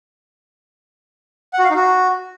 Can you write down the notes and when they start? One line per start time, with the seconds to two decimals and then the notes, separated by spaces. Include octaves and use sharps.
1.53 F#5
1.59 F#4
1.64 F5
1.70 D#4
1.76 F#4